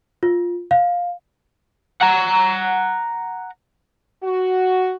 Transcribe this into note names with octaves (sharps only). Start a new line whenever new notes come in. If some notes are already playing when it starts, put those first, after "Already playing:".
F4
F5
F#5 A#5
F#4